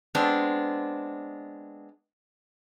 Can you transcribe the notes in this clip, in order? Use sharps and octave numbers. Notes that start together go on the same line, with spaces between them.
G#3 B3 C4 D4